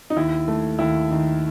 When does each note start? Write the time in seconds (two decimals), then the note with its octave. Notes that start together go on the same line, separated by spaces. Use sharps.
0.10 D#4
0.16 D#2 E4
0.48 A3
0.79 D#2 E4
1.11 D#3